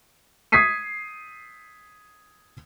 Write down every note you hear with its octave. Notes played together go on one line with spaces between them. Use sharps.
D#6 G#6 B6 C7 D#7